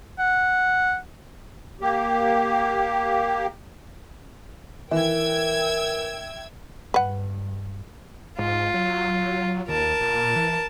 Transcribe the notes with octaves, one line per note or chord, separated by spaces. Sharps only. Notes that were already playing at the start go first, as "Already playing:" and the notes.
F#5
A#3 G4
E3 A#4 E5 G5 E6 G#6
G2 B4 F#5
G#2 F4
F#3
D#2 A#4 A5
A#2
E3